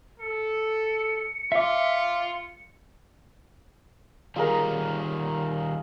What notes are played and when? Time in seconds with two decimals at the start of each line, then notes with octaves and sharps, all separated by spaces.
0.20 A4 C#7
1.52 F4 E5 D6
4.36 D#3 G3 D#4 F4 G#4 A#4